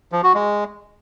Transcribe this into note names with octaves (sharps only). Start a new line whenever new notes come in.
F3
F#4
G#3